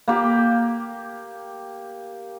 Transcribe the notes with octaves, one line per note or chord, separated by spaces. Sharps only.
A#3 G4